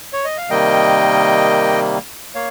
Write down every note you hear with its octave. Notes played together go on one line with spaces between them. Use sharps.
C#5
D#5
F5
C3 D#3 G3 A#3 D#5 G5
A#3 C#5 F5